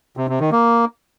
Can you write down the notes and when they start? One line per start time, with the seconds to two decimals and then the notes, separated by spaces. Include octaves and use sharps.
0.17 C3
0.29 C3
0.40 D#3
0.52 A#3